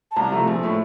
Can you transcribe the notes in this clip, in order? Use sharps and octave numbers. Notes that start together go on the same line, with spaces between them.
A5
C2 A#5
C3 F3 A3
A#1
A2 A3